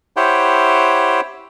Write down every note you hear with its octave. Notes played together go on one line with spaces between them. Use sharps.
E4 G4 C5 C#5 F#5 G5